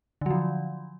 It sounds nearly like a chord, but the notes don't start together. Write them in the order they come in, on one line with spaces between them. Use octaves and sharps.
D3 F#3 F3